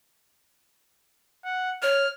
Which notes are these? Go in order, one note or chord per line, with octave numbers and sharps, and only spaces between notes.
F#5
C#5 F6